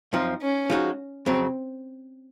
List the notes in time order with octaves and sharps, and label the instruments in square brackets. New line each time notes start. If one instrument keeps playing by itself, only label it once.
[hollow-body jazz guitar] F#2 F3 C4 [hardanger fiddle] D#4
[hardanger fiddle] C#4
[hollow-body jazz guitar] F3 G#3 D#4 F#4
[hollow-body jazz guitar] F2 C#3 F#3 [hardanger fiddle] C4